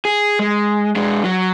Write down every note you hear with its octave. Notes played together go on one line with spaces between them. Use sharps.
G#4
G#3
G#3 D4
F#3